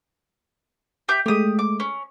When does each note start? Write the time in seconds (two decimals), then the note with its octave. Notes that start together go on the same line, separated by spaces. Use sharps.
1.09 G4 E5 G6
1.26 G#3 A3 G4 D#6
1.59 D6
1.80 C#4